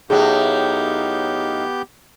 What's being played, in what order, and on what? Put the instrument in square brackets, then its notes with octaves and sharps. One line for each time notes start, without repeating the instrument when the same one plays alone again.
[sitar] A2 F#3 [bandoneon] B3 G4 G6 [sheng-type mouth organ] D#4 F5 [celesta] G#4